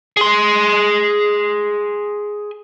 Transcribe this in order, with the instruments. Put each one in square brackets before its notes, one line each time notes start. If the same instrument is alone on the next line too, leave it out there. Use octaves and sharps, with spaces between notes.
[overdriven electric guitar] G#4 C6